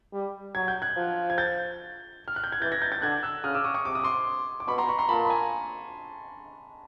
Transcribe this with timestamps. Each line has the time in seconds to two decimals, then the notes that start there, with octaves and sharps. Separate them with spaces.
0.13 G3
0.55 F#3 G#6
0.68 G6
0.82 F#6 G#6
0.96 F3
1.30 G#6
1.38 G6 A6
2.28 F6
2.36 F#6
2.44 G6
2.52 G#6
2.61 E3 G6 A6
2.72 G#6 A#6
2.82 G6 A6
2.92 G6 A6
3.02 D3 F#6 G#6
3.23 E6 F#6
3.44 C#3 D#6 F6
3.54 D6 E6
3.64 C#6 D#6
3.74 C#6 D#6
3.85 C3 D6
3.95 D#6
4.04 C6 D6
4.60 D6
4.68 B2 B5 C#6
4.78 A#5 C6
4.88 B5 C#6
4.99 A#5 C6
5.09 A#2 A5 B5
5.25 B5
5.30 G#5 A#5